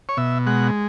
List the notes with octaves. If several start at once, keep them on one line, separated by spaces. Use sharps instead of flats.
C#5
B2 E5
G#3 F#5